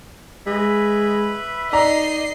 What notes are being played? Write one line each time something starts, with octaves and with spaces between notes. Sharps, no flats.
G#3 B4 E5 B5
D#4 D5 D#5 A#5 C7